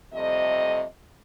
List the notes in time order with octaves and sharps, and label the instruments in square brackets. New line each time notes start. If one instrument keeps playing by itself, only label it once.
[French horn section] F2 C3 G3 A3 D#5